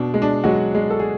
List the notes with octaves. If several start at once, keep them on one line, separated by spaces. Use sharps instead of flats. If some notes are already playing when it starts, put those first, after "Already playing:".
Already playing: B2 D4
G#3
D4
F#3 G#3 F#4
G#3
A4
G#4